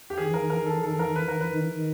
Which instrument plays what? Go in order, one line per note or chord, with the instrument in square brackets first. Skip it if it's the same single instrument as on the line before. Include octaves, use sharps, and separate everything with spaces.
[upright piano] G4
[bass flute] D#3 [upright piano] G#4
[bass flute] E3 [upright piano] A#4
[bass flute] D#3
[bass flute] E3 [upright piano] A#4
[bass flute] D#3 [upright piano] A4
[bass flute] E3
[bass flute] D#3 [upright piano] A4
[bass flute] E3 [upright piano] A#4
[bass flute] D#3
[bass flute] E3 [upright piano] B4
[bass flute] D#3 [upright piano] A#4
[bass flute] E3 [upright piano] B4
[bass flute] D#3
E3
D#3